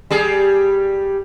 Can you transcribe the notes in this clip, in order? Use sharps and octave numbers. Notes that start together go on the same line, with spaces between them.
G3 G#4